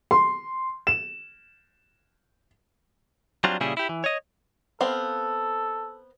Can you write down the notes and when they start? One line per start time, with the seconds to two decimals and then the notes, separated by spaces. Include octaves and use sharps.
0.11 C6
0.87 E7
3.44 F#3 G3 C4 D4 F4
3.60 A#2 C#3 G3 E4 G4 G#4
3.77 E4 G4
3.89 E3
4.04 C#5 D#5
4.81 B3 C4 A4 F5